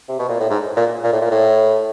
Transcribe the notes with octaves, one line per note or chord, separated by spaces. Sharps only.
C3
B2
A#2
A2
G#2
A#2
A#2
A2
A#2
A2